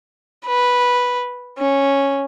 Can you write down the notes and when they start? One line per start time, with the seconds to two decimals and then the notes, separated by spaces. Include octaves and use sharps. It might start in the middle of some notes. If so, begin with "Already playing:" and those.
0.46 B4
1.58 C#4